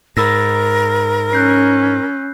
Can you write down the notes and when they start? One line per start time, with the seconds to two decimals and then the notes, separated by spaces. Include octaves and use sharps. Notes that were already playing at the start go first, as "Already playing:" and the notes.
0.17 G#2 A#4 B5 E6 A#6
1.33 C#4 F#6 G6 C7